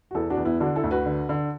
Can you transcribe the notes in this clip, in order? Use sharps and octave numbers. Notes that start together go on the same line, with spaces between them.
F#4
E2 E4 A4
D4 F#4
E2
B3 E4
D3 D4 F#4
E4 A4
D2
F#4 B4
D3
D3